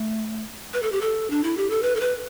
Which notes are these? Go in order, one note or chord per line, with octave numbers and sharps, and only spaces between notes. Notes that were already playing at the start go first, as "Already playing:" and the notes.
Already playing: A3
B4
A4
G4
A4
D4
E4
G4
A4
B4
A4
B4